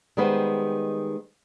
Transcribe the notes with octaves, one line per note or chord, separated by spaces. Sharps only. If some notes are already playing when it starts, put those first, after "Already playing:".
D#3 G3 G#3 B3 C5